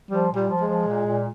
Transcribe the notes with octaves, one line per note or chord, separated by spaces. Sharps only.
F3 G3
A#2
G3
F3
G#3
F3
A#2
A#2